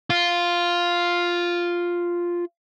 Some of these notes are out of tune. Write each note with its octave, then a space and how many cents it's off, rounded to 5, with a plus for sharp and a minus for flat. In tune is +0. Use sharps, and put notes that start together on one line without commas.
F4 +0